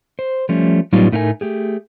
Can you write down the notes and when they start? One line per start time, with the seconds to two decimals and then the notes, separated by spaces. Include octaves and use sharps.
0.19 C5
0.49 F3 G3 A3 C#4
0.93 A2 F#3 G3 B3 D#4 F4
1.12 A2 A3 D#4 A#4 F5 G#5
1.41 A3 G4 G#4